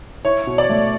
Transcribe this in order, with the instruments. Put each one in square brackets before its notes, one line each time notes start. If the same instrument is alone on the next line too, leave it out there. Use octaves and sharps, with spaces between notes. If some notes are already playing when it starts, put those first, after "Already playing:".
[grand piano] E4 [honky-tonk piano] C#5
[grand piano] B2
[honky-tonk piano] D5
[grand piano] A3